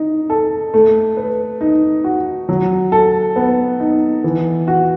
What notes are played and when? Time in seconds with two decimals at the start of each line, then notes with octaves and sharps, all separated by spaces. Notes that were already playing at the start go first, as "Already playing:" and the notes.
Already playing: D#4
0.30 A4
0.74 A3
1.17 B4
1.61 D#4
2.04 F#4
2.49 F#3
2.92 A4
3.36 B3
3.80 D#4
4.24 E3
4.68 F#4